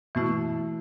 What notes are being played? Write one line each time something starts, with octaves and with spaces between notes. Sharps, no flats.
B2 E3 A3 E4